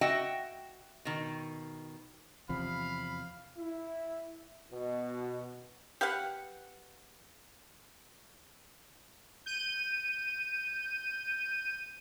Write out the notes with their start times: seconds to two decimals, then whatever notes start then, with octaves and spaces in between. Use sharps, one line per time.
0.01 F#4 D#5 E5 F#5 G5
1.05 B2 D#3
2.49 E2 C3 F3 F5 B5
3.58 E4
4.72 B2
6.01 G4 B4 F5 F#5
9.46 G6 D#7